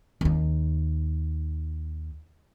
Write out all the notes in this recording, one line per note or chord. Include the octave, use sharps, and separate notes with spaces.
D#2 D#4